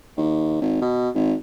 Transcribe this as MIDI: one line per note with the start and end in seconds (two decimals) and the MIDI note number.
0.17 0.60 39
0.61 0.80 32
0.81 1.09 47
1.15 1.34 32